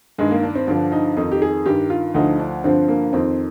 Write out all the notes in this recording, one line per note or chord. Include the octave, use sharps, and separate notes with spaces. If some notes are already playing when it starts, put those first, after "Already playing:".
G2 D#3 G#3
A#3
D4
C4
G2 D3 F3 D4
D#4
F2 D#3 D#4
G4
G#4
G2 D#3 G4
F4
D2 D3 F3 D#4
D4
G2 D3 F3 C4
A#3
F2 D#3 C4